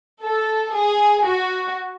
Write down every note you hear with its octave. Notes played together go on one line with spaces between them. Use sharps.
A4
G#4
F#4